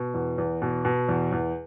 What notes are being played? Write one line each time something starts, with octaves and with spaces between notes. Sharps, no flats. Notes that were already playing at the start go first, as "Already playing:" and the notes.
Already playing: B2
E2
E2
B2
B2
E2
E2